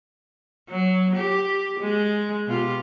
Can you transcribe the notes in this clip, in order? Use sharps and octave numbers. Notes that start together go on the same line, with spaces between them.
F#3
G4
G#3
B2 F4 G4